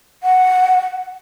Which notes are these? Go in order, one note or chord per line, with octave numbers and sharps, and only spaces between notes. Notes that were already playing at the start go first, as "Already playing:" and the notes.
F#5